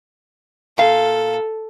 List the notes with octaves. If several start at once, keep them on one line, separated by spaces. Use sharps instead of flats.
A#2 A4 F5